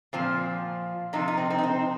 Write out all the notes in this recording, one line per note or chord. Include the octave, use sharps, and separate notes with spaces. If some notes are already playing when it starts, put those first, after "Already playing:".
A#2 F3 C4
C3 F3 D#4
D#4
C4
C4
D#4
C4